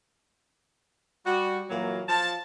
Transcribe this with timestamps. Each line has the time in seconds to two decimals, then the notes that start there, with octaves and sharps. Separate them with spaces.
1.26 G3 F#4
1.70 A#2 E3 F#3 A#3
2.09 F3 F4 A5